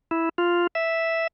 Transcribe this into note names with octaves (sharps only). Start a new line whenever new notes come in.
E4
F4
E5